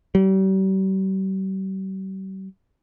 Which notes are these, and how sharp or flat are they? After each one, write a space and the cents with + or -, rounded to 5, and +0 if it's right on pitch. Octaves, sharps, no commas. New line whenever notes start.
G3 -40